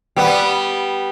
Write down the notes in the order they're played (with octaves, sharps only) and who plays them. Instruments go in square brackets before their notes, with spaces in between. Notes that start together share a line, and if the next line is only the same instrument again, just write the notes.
[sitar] G3 B3